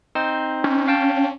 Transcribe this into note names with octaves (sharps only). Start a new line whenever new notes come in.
C4 D#4 C5
C#4
F5 G5 A5